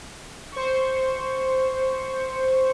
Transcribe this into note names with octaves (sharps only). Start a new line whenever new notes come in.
C5 C#6